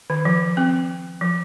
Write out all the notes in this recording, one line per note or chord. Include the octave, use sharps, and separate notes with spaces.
D#3
F3
C4
F3